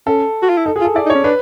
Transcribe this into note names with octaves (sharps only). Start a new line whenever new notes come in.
C#4 A4
F#4
F4
E4
D#4 A4
G#4
F4
A4
E4 D5
D#4
C#5
C#4
D4 B4